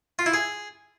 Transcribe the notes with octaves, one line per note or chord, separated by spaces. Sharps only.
F4
E4
G#4